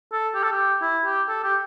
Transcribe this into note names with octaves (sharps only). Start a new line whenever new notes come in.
A4
G4
A4
G4
E4
G4
A4
G4